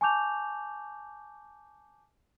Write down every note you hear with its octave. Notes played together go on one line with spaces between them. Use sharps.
G#5 A5 C#6 D6 G6 F7